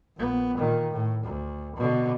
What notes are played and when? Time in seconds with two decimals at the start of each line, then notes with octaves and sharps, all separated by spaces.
0.17 A#1 B3
0.57 A#2 D#3
0.92 A2
1.25 D2
1.76 B2 D3